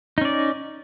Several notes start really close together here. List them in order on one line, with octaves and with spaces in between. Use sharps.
D#4 C#4 D5